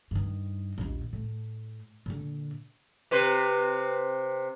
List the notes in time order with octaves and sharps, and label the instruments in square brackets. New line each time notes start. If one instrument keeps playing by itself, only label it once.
[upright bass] G2 D#3
A#1 D#2
A2
A#2 D3
[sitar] C3 B4 C5